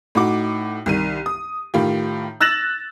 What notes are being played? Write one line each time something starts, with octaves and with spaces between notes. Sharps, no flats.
A2 D#4 F#4 D6
C2 D#3 D#7
D#6
A2 D#3 F4 G4
E6 F#6 A6 A#6 E7 F#7